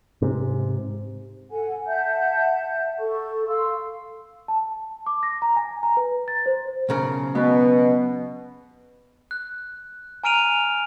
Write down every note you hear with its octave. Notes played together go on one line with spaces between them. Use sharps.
G#2 C3
A4 F#5 G#5
E5 F#5 A5 G6
A4 C#6
A4 F5 C6 E6
A5
D6
A#6
A#5
G#5
A#5
B4
A6
C5
B1 C#3 A#4
B2 B3
F#6
G#5 A#5 F6 D7 D#7 F7